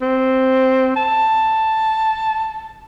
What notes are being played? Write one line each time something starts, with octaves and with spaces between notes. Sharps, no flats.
C4
A5